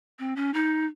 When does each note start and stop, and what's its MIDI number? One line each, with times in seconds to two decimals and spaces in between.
0.19 0.34 60
0.36 0.53 61
0.54 0.86 63